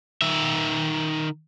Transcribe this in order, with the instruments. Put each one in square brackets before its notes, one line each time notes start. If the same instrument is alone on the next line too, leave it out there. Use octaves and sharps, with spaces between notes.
[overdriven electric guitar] D#3 E5